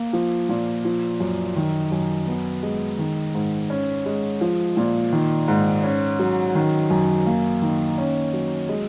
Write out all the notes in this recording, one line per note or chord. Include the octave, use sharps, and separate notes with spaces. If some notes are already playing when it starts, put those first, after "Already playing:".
Already playing: A#3
F3
A#2
F3
F#2
D#3
F#2
B3
G#3
D#3
G#2
C#4
G#3
F3
A#2
D#3
G#2
C#4
F#3
D#3
F#2
A#3
D#3
C#4
F#3
G#3